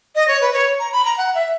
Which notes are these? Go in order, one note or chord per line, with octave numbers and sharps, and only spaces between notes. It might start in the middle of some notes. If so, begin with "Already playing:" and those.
D#5
C#5
B4
C#5
A#5
B5
A#5
F#5
E5